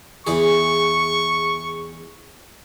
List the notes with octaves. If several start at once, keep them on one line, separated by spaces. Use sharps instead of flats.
E2 E3 G#4 C#6